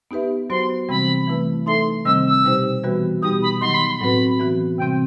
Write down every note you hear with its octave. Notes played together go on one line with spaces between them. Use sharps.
B3 D#4 G4 B4 E5
F#3 B3 F#4 C5 C6
C3 E3 G3 C4 B5
E3 A3 E4 B4
A3 D#4 A4 E5 C6
C3 D#3 G3 C4 E6
E6
B2 G3 D#4 G4 C5
E3 G3 B3 F#4 B4
B2 G3 B3 D#4 G4 D#6
B5
D#3 F#3 B3 D#4 C6
B5
C6
A2 F#3 C4 F#4 B4 B5
E3 B3 F#4
C3 E3 G3 C4 G5